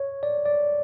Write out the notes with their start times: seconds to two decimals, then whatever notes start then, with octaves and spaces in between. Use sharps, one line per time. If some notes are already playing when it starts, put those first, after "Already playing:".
Already playing: C#5
0.23 D5
0.46 D5